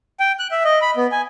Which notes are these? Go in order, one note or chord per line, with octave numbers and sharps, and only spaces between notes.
G5
F#6
E5
D#5
B5
B3
G#5